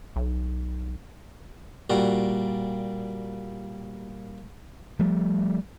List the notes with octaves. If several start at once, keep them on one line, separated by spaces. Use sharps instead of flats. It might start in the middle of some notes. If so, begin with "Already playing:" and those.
B1
A#2 G3 F#4
F3 G3 A3